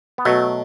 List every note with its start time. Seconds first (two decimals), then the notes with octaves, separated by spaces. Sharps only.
0.18 B3
0.25 B2 F#3 A3